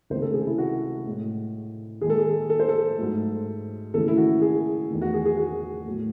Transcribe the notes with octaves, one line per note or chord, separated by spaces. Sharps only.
C#2 C3 D#3 A3 C5
A4
G#4
E4
F#4
A2 G#3
D#2 D#3 G#3 G#4
A4
G#4
A4
C5
A4
G#2 F#3 A3
D#2 C#3 E3 A3 A4
E4
F#4
G#4
E2 D#3 A3
F#4
G#4
G#4
F#4
A2 F#3 A3